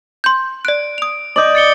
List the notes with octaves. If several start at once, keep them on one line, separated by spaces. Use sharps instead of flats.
C6 G6
D5 F#6 D7
D#6 F7
D5 D#5 G6 F#7
A6 C#7 G7